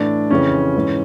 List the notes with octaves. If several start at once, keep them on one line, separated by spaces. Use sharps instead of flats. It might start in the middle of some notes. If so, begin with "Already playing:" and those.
Already playing: A2 E3 D4
F2 C#3 E3 C#4
G#2 E3